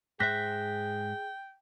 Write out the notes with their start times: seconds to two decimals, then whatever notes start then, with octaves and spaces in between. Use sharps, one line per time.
0.20 G#2 G#4 C5 E5 G5 F#6 A#6 B6